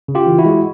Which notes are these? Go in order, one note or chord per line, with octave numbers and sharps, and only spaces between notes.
C#3
F4 G4
E3
E4 F#4
G#3